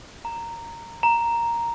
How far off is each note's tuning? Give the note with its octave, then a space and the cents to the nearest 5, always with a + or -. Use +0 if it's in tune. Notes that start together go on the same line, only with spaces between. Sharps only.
A#5 -10
A#5 +0